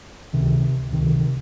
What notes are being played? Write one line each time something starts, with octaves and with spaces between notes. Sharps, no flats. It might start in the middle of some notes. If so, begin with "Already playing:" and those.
C#2 C3 D#3
C#2 C3 D#3